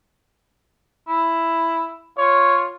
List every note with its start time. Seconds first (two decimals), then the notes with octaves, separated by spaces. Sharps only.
1.08 E4
2.18 F4 C#5